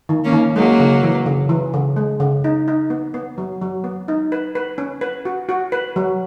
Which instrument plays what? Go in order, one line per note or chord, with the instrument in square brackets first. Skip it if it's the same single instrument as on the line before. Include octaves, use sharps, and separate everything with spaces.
[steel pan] D#3
[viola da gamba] A#3 C#4
[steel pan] D#3
[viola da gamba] F#3 A#3 [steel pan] G#3
[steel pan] C#3
E3
C#3
E3
C#3
G#3
C#3
D#4
D#4
B3
B3
F#3
F#3
B3
D#4
B4
B4
C#4
B4
F#4
F#4
B4
F#3